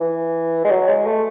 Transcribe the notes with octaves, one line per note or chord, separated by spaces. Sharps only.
E3
G#3
F#3
G#3
A3